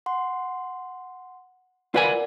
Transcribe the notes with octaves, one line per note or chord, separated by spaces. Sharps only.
F#5 C6
F4 A#4 B4 D5 F#5 G#5